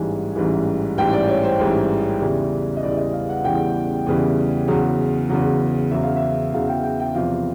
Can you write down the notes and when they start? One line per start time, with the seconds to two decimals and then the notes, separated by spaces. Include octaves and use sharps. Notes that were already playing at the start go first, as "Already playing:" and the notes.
Already playing: A1 G#2 E3 G3 G#5
0.36 A1 G#2 E3 G3
0.98 A1 G#2 E3 G3 G5
1.13 D5
1.28 C#5
1.43 C5
1.59 A1 G#2 E3 G3
2.20 E2 C#3 E3 G3
2.77 D#5
2.83 E2 C#3 E3 G3 D5
2.98 D#5
3.13 F5
3.29 F#5
3.45 E2 C#3 E3 G3 G5
4.06 E2 C#3 E3 G3
4.68 E2 C#3 F#3
5.29 E2 C#3 F#3
5.91 E2 C#3 F#3 E5
6.03 F5
6.16 E5
6.53 E2 C#3 F#3 F5
6.68 G5
6.83 G5
7.00 G5
7.15 E2 C3 F3 F5